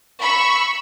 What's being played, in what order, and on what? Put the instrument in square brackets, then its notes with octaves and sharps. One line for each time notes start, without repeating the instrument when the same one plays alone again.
[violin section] B5 C#6 E6